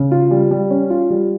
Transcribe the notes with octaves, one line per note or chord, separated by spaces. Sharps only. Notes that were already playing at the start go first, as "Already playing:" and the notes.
Already playing: C#3
F4
G3
G3
C#4
F4
G3